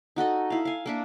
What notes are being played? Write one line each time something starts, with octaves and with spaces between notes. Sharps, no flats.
D#4 F#4 A4 D#5
E4 F5
F5 G#5
A#3 D4 E5